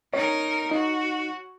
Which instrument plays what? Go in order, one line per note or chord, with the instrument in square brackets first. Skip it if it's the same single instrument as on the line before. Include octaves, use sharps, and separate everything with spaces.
[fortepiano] C#4 [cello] D#4 A#4
[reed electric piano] D#4 [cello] F#4